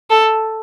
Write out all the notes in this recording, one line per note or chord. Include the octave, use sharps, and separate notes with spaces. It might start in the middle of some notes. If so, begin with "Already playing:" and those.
A4